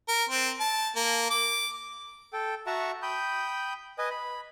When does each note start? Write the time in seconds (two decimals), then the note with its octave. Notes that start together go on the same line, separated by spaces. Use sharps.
0.09 A#4
0.29 C4
0.60 A5
0.96 A#3
1.31 D6
2.33 A4 G5
2.67 F#4 E5 F#5 A5 A#5 C#6
3.02 G5 B5 D#6 G6
3.99 B4 D#5 G#5 D#6
4.10 B5